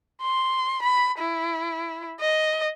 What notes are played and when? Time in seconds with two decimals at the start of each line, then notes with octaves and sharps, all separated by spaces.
0.22 C6
0.82 B5
1.19 E4
2.21 D#5